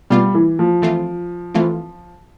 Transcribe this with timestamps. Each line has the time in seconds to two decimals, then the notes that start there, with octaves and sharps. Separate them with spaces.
0.10 B2 G3 B3 F4
0.35 E3
0.59 F3
0.82 E3 A3 C4 F4
1.54 E3 A3 C4 F4